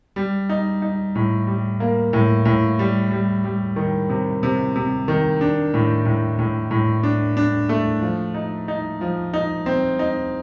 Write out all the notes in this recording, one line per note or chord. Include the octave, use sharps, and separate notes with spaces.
G3
D#4
D#4
A2
G3
A#3
A2
A2
G3
G3
G3
D#3
C3
C3
C3
D#3
D4
A2
A2
A2
A2
D4
D4
A3
F3
D#4
D#4
F3
D#4
C4
D#4